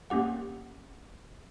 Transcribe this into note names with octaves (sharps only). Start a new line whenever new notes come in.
A#3 C#4 G4 F#5